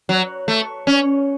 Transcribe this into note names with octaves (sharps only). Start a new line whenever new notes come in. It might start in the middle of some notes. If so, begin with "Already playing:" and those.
F#3
A3
C#4